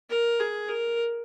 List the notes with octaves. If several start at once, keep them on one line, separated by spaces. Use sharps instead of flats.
A#4
G#4
A#4